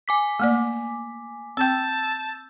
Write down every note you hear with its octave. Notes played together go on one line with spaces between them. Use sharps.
G#5 D6 B6
A3 A#3 D5
C4 G5 A5 E6 G6